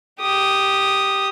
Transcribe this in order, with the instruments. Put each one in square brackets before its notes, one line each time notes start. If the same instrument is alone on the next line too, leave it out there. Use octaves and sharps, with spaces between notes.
[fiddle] G4 D#6